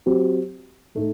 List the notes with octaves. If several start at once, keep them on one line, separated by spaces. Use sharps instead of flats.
F#3 C4 G4
A2 A3 D#4